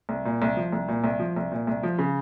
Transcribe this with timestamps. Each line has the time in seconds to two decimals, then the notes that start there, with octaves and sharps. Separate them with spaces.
0.09 C2
0.25 A#2
0.42 C2
0.57 F3
0.72 C2
0.88 A#2
1.04 C2
1.19 F3
1.36 C2
1.52 A#2
1.67 C2
1.83 F3
1.98 C#3